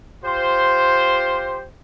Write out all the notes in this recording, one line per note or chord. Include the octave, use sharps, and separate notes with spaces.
F4 G4 C5